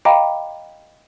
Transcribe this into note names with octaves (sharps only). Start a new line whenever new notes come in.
D#5 F5 G5 A#5 B5 D6